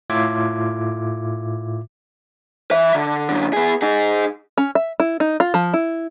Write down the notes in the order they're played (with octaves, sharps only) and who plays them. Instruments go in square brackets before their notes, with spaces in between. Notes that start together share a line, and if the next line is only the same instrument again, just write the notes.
[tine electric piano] A2 F4 E5 D6 G#6
[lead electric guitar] E3 E5
D3
F#2 D3
B3 G#4
D#4 G#4
[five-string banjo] C#4
E5
E4
D#4
F4
F3
E4